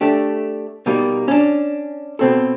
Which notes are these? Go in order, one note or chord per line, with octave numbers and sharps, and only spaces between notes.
A3 D4 G4
B2 G3 A#3 D#4
C#4 D4
B2 C4 A4